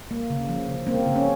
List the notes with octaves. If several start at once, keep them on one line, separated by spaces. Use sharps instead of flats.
A#3
C#3
F3
C#3
A#3 C4
C#3
C#4